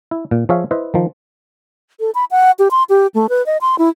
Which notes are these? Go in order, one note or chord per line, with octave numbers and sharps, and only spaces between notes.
E4
A#2
F3 G#4 C#5 E5 F5
E4 B4 C5 D#5
D#3 F3
A4
B5
F#5
G4
C6
G4
A3
B4
D#5
C6
E4